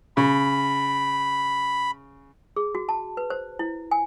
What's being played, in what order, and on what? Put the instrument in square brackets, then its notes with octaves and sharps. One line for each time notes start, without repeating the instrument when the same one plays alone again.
[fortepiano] C#3 [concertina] B5
[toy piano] G#4
F#4
A5
B4
C5
E4
G#5